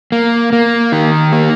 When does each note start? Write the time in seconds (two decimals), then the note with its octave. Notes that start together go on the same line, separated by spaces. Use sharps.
0.12 A#3
0.53 A#3
0.92 D#3
1.33 A#3